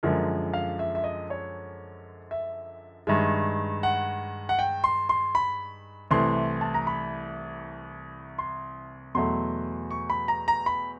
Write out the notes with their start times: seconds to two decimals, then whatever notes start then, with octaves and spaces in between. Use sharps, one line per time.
0.03 F#2 D3 F3 G#3 A#4
0.54 F5
0.79 E5
0.95 E5
1.04 D#5
1.30 C#5
2.31 E5
3.07 G2 D#3 G#3 E5
3.83 F#5
4.49 F#5
4.59 G5
4.84 C6
5.09 C6
5.35 B5
6.11 C2 C3 E3 A3 C6
6.61 A5
6.74 A#5
6.87 B5
8.38 C6
9.15 E2 B2 F#3 A3 C6
9.91 C#6
10.10 B5
10.28 A#5
10.48 A#5
10.66 B5